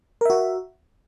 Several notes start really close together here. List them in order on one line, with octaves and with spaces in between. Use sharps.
A#4 E5 F#4